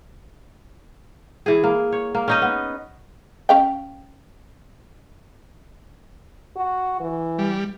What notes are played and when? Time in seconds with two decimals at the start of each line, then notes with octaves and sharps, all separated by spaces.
1.46 E3 G#4
1.64 A#3
1.92 C#5
2.15 A#3
2.28 C#4 D#4 D#5
2.42 B3
3.49 C#4 F5 G5
6.56 F#4
7.00 E3
7.38 G3